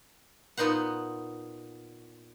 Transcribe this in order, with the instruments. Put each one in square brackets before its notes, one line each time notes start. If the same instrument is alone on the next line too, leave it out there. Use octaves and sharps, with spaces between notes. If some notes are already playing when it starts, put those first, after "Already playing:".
[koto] A#2 B3 D#4 C5 F#5